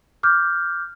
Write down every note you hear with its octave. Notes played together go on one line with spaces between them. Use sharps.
D6 F6 G6